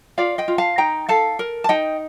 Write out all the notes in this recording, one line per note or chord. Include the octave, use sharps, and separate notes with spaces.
F4 D5 F5
D#5 G5
F4
F5 A5
D#4 G5 A#5
A4 F5 A5
A#4
A5
D#4 D#5 G5